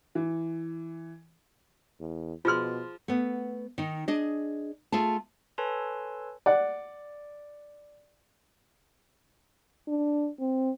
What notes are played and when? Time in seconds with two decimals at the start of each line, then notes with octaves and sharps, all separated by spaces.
0.15 E3
2.00 E2
2.45 B2 F3 F4 G#4 C6 F6
3.08 A3 B3
3.78 D#3 D#4
4.08 D4 G#4 D#5
4.92 A3 F4 G#4 A5
5.58 A4 B4 C#5 G#5 A5 C6
6.46 D5 F#5
9.88 D4
10.40 C4